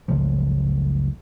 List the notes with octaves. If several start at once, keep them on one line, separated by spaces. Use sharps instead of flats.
F#1 C#2 A2 F3